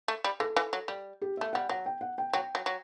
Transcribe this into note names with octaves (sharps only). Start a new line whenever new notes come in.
A3
G3
E3 A4
E3
F#3
G3
G4
A3 E5
G3 F#5
F#3 F#5
G5
F#5
G5
F#3 G5
F#3
F#3